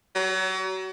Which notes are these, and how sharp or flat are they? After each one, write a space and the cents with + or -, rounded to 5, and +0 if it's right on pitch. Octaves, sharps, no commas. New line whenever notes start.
F#3 +35